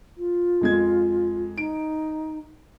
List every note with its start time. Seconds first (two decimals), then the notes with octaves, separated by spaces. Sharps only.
0.18 F4
0.61 F2 G#3 G#6
1.58 D#4 D7